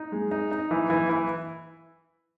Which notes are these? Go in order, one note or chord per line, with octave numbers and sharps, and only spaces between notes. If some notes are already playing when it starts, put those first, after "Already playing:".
Already playing: D#4
G#3
D#4
D#4
E3
E3
E3